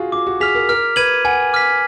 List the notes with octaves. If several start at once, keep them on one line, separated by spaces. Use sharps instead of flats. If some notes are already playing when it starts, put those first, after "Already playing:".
Already playing: F4 F#4 G#4
F4 D6
F#4
G#4 F6 B6 F7
A#4
A#4 F6
B4 G#6 D#7 F#7
F#5 G#5
D6 F6 B6